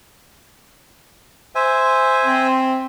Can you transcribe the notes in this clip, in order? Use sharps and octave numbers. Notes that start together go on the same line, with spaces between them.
C5 E5 G#5
C4